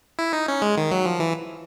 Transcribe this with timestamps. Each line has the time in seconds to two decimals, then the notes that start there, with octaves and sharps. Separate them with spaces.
0.19 E4
0.33 D#4
0.48 C#4
0.62 G#3
0.77 D#3
0.92 F#3
1.06 F3
1.20 E3